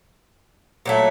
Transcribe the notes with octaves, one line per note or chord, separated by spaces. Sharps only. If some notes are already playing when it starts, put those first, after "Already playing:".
A#2 F#3 A3